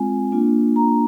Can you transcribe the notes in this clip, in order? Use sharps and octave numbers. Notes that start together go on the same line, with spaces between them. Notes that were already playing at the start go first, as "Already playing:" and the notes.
Already playing: G#3 C4 F4 G#5
A#3 D4 F4
A#5